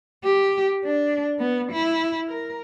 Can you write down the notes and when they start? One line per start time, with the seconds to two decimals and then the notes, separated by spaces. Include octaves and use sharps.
0.24 G4
0.85 D4
1.39 B3
1.72 E4
2.28 A#4